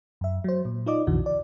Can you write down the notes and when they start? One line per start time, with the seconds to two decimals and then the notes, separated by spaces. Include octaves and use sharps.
0.21 F#2 E5
0.44 F#3 C5
0.65 A#2
0.86 D#4 F4 D5 D#5 D6
1.07 B1 F2 B2 D3 E3 F#4
1.26 D5